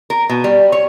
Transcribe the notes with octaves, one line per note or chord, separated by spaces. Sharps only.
A#4
B2
G3
C#5